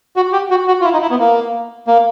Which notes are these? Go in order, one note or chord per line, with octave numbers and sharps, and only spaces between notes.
F#4
G4
F#4
F#4
F4
E4
D#4
E4
B3
A#3
A#3